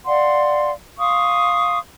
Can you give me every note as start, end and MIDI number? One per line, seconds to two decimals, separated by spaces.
0.06 0.71 74
0.06 0.71 77
0.06 0.71 78
0.06 0.71 84
0.98 1.79 77
0.98 1.79 84
0.98 1.79 85
0.98 1.79 87